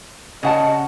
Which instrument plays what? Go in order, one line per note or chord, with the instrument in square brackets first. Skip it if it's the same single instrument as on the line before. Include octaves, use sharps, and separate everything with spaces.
[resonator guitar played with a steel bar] C#3 F#5 A5 [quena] D#5